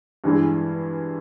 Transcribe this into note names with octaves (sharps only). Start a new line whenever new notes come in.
G2 E3 G#3